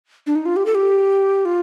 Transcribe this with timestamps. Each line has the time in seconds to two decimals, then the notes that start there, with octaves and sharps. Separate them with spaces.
0.27 D4
0.35 D#4
0.46 F4
0.56 G4
0.66 A4
0.75 G4
1.45 F4